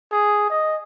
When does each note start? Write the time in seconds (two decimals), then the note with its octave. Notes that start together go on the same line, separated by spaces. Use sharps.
0.12 G#4
0.50 D#5